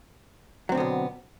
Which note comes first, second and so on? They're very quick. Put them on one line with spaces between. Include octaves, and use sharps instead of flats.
F#3 C4 D3 B3 B2